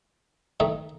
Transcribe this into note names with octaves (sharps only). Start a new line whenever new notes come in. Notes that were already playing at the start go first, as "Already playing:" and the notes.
D#3 A3 D#4